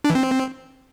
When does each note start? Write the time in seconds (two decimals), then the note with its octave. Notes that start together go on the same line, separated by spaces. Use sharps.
0.04 D4
0.10 E3
0.15 C4